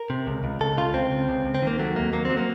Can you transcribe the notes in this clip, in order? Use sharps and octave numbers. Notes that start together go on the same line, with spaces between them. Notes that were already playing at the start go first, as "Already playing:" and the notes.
Already playing: A#4
C3
C#2
C#2
C#2 A4
C#3 F4
C#2 C4
C#2
C#2
C#2
C4
D#3 A#3
F#3 A3
D#2 A#3
F#3 A#3
C4
F#3
A#3